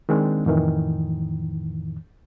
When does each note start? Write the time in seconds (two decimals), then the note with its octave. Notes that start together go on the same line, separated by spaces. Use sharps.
0.09 D#3 G#3 C4 D4
0.46 F2 A2 D#3 E3